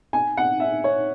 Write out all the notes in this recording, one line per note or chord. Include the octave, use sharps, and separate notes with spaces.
G#5
F#5
E5
C#5